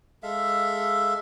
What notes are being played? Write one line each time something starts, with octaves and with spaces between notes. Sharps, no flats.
G#3 A4 E5 F5